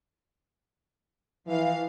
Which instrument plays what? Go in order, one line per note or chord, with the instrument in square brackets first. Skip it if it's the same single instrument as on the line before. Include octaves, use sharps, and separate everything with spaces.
[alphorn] E3 [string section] F3 F5